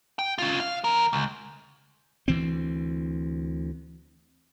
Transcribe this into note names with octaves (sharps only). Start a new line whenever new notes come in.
G5
C#4 F4
F5
E2 A#4
C#2
D2 E3 C4